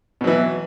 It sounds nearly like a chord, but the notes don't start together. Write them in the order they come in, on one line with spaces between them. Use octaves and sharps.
B2 F#3 E3